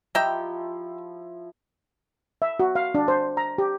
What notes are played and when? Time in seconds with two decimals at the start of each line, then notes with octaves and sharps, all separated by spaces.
0.15 F3 E4 G4 D#5 E5 G5 A#5
2.42 E5
2.60 F#4
2.75 F5
2.95 D4
3.08 C5
3.37 A#5
3.58 G4